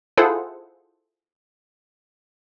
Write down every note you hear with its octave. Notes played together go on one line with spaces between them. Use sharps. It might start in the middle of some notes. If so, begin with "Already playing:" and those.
E4 F4 G#4 A4 C5 F#5